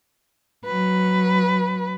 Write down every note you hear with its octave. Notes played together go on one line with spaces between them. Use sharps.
F#3 B4